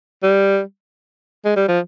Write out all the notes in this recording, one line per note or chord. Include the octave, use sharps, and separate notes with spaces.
G3
G#3
G3
F3